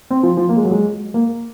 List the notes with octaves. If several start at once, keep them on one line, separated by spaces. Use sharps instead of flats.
C4
F3
F3
A#3
G#3
F#3
G#3
A#3